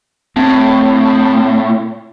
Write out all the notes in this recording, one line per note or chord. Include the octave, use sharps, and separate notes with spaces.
A2 C4